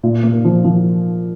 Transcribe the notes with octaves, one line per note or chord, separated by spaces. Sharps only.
A#2
A#3
F3
F3